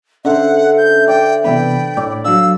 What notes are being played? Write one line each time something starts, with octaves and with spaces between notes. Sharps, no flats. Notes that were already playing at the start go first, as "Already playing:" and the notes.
D3 C#4 C5 E5 F#5
G6
D5 G5
C3 E3 B3 D5 G5 B5
A2 C#5 D5
F#3 D4 F5 E6